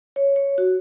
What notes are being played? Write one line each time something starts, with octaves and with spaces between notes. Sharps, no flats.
C#5
C#5
F#4